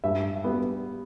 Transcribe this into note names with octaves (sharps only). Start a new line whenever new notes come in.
G2 E5
G3 B3